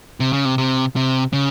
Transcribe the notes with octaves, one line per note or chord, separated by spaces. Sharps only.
C3
C#3
C3
C3
C3
C#3